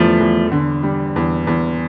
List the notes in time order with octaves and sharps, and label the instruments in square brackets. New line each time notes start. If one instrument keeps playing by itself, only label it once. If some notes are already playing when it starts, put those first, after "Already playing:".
Already playing: [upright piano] E2 D3 G3 [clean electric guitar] F3 A3
[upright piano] E2
D3
G3
E2
E2